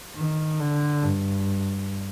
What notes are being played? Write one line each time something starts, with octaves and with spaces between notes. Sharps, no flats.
D#3
D3
G2